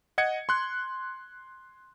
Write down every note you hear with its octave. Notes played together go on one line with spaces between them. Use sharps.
D#5 F#5 G#6 C#7
C6 F#6